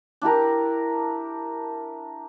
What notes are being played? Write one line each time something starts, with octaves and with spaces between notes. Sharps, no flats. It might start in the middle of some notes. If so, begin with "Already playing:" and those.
D4 E4 G4 A#4